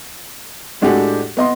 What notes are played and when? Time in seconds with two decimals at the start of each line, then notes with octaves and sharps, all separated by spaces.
0.81 A2 G#3 D4 F#4 G4 A4
1.37 B3 D#5 C6